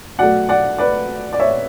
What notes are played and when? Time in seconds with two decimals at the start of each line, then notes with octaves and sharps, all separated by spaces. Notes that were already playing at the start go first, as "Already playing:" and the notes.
0.19 B2 F#3 A3 D5 F#5
0.49 D5 F#5
0.78 B4 D5
1.33 D5
1.40 C#5 E5